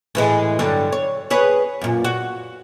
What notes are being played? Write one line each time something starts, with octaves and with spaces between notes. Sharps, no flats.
A2 E3 G#3
G2 D3 F#3
C#5
G#4 B4 C#5
F#2 A#2
F#4